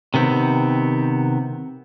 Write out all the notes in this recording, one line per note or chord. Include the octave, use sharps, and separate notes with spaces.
C3 D#3 B3 C4